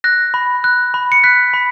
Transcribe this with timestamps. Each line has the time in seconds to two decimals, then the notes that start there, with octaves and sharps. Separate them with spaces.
0.04 F#6 A#6
0.34 B5
0.64 F#6
0.94 B5
1.12 C#7
1.24 F#6 B6
1.54 B5